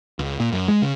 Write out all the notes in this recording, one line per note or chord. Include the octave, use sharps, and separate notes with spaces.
C#2
A#2
F#2
G#3
C#3